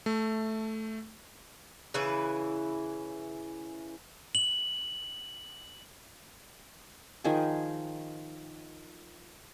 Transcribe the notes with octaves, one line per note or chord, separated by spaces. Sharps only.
A3
C#3 E3 E4 B4
F#7
D#3 F3 G#4